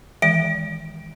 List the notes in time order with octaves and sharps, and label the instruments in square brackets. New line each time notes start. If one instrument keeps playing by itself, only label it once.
[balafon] D#3 E3 G#3 [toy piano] E5 [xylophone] D7